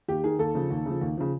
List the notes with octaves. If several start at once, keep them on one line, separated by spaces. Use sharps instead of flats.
D#2 G4
D#3 G#4
D#2 A4
C#3 F3
D#2
C#3 F3
D#2
C#3 F3